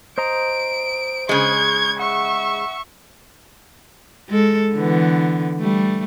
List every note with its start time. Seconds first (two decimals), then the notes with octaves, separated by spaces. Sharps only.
0.18 C5 D#5 A#5 D7
1.29 C#3 G#3 C#6 G#6
1.99 E5 F#5 C#6
4.29 G#3 A4
4.74 D3 E3 B3
5.60 G3 A3